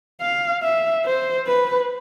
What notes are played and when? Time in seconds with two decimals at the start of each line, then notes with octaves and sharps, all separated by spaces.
0.21 F5
0.63 E5
1.05 C5
1.47 B4